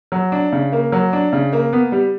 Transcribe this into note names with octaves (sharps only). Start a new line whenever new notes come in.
F#3
D4
C#3
A#3
F#3
D4
C#3
A#3
B3
G3